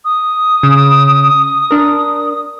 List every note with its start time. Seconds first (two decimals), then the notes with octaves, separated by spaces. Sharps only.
0.05 D#6
0.63 C#3
1.71 D4 A#4